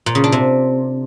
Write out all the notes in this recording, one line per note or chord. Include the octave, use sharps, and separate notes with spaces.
A#2
C#3
D4
C3